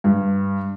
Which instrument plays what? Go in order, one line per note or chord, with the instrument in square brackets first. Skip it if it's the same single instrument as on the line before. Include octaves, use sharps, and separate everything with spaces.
[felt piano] G2